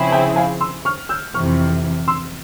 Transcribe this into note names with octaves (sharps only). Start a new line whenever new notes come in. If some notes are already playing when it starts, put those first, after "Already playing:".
Already playing: C#3 F3 C4 E4 G#4
E5 G5
F5 G#5
C6 E6
C#6 F6
E6 G6
F2 C3 E3 C#6 F6
C6 E6